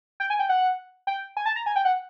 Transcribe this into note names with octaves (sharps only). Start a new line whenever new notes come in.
G5
G#5
G5
F#5
G5
G#5
A5
A#5
G#5
G5
F#5